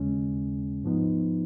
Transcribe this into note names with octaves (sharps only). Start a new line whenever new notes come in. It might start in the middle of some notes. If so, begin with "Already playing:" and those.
Already playing: D#2 C#3 G#3 C#4
G#2 F3 B3 D#4